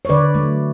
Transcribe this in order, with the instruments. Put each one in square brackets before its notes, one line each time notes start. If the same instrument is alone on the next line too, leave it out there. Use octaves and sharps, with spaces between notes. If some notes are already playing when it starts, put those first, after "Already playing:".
[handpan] C#5
D3 B4 D5
F#3 A3